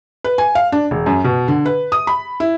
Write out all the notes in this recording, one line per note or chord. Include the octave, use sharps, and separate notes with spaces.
B4
G#5
F5
D4
E1
F#2
B2
D3
B4
D#6
B5
E4